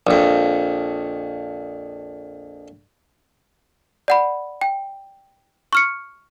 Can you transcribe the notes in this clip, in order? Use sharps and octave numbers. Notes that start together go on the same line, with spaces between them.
A#1 F2
D5 F#5 B5
G5
C#6 F6 C#7